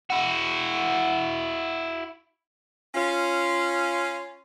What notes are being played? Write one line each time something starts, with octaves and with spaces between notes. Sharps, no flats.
E4 F#4
C#4 F4